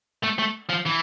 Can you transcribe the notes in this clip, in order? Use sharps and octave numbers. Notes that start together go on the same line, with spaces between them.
A3
A3
F3
E3